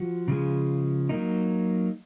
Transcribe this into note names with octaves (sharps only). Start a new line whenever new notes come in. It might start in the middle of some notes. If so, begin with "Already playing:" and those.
Already playing: F3 F#4
C#3 F3 G#3
F#3 A#3 D#4